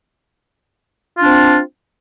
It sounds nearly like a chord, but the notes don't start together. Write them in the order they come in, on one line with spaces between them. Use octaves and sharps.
F4 D4 C4